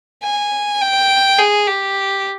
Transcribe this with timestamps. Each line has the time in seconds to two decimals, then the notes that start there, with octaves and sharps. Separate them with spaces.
0.23 G#5
0.81 G5
1.38 G#4
1.67 G4